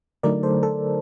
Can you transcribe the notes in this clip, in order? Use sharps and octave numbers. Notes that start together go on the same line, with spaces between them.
D3 F#3 A3 D#4 A#4 D5
A4 C5
A4